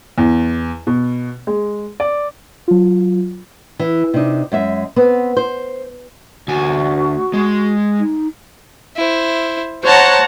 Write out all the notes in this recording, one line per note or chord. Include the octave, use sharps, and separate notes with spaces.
E2
B2
G#3
D5
F#3 F4
E3
C3 D4 D#4
F#2 G#3 E5
B3 C4 B4
C5
D2 F#4 G#5
G#3
D#4
E4 C5
C5 C#5 F#5 A5 A#5